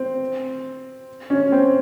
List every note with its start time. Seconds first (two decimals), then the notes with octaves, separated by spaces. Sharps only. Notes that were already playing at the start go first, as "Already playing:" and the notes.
Already playing: C4
1.30 C#4
1.52 C4